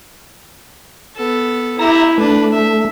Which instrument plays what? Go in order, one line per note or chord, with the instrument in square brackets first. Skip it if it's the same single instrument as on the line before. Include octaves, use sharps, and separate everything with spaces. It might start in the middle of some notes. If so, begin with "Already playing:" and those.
[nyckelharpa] B3 A4
[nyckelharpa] E4 G4 [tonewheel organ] E5 A#5
[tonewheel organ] A3 [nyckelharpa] D4 B4
[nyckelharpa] E5